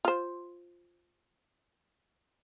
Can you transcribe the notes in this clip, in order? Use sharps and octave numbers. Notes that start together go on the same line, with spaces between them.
F4 C5